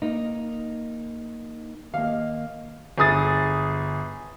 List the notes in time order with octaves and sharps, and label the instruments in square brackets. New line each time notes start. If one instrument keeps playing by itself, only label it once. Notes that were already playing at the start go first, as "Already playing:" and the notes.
[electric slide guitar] A#3 D#4
[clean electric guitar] D#2 A#3 [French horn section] D#5 [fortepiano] F5
[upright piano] G1 G#4 D#6 A6